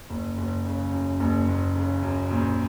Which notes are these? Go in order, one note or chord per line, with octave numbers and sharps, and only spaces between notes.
F#1
F#1
C#3
F#2
F#1
F#1
C#3
F#2
A#1